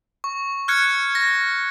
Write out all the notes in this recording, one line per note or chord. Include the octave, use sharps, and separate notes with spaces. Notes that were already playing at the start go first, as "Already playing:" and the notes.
C#6
F6 F#6 G#6 C#7
A#6